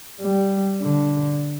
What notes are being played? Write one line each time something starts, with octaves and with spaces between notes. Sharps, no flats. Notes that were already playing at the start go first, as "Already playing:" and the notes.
G3
D3